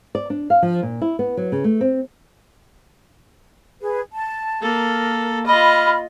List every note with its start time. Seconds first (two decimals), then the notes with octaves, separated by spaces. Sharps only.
0.15 D5
0.30 D4
0.50 F5
0.62 F3
0.83 A#2
1.02 E4
1.19 B3
1.37 F#3
1.52 C#3
1.64 A3
1.81 C4
3.80 G#4 B4
4.12 A5
4.62 A#3 A4 A#4
5.46 F4 D#5 B5 F6